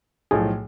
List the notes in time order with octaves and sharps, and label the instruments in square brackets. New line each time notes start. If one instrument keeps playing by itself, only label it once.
[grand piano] B1 A2 F3 A3 [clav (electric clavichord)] G#4